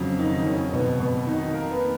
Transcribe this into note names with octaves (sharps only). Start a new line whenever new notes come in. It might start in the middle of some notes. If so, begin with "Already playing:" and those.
Already playing: F2 C#3 F#3
D#3 D#4
C#3 C#4
B2 B3
B2 B3
D#3 D#4
A#3 A#4
B3 B4